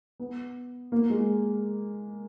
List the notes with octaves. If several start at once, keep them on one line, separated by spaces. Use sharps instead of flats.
B3
A#3
G#3